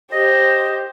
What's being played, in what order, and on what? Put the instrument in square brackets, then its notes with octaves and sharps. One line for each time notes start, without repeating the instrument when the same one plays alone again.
[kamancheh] G4 C5 [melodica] D#5